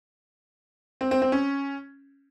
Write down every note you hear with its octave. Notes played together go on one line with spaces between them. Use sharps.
C4
C4
C4
C#4